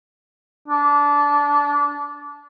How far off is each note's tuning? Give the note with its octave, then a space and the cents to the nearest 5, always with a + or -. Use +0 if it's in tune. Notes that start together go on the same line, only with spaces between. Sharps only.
D4 -20